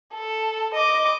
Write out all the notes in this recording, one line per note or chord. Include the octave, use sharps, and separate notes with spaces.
A4
D#5 D6